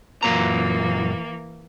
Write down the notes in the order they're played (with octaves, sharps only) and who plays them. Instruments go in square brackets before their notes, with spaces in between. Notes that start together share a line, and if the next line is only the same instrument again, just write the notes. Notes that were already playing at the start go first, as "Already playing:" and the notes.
[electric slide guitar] F#2 A#2 A#5 [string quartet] E3 A#3